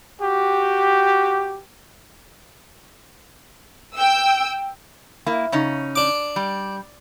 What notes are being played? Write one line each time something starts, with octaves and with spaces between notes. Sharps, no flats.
F#4 G4
G5 E6
A#3 E4
C#3 C#4 D#4
D4 D6
G3